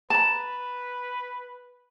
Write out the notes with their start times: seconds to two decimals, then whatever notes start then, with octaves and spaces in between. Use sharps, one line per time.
0.10 B4 A5 A#5